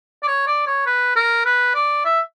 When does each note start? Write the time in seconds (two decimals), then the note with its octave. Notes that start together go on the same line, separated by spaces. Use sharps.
0.23 D5
0.28 C#5
0.47 D5
0.67 C#5
0.86 B4
1.16 A#4
1.45 B4
1.75 D5
2.05 E5